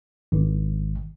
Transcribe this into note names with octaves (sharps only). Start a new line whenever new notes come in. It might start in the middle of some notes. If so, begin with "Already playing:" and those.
G#1